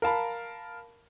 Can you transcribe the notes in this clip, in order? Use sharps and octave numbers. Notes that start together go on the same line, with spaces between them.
A#4 F5 A5 B5